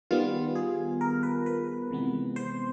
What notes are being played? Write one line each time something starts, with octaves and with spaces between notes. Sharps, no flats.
D#3 G3 B3 F4
G#4
A#4
B4
B4
C3 E3 G#3 B3
C5